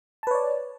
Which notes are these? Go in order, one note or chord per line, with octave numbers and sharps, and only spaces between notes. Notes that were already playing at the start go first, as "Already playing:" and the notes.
B4 C#5 D5 A5